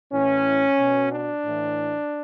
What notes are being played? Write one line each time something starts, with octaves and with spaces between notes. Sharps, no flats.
A2 E3 C#4
B2
D4
A2 E3